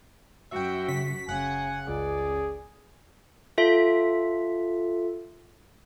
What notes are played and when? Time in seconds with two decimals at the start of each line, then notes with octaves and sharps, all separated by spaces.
0.51 F#2 F#4 E5 G5
0.88 C#3 B6
1.29 F#1 C#3 F#5 G#5
1.88 C#2 G#4 D5
3.58 F4 A4 E5